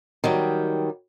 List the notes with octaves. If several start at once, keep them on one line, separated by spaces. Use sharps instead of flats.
D#3 F#3 G3